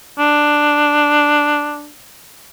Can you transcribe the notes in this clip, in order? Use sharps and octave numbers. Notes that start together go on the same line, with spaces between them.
D4